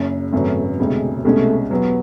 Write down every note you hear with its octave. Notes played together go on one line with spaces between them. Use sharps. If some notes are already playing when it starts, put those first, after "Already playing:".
Already playing: F#1 F#2 C#3
G#1 F#2 C#3 F#3 A3 B3
E1 D2 C3 G#3
C2 B2 G#3 A3 C#4
E2 B2 F#3 B3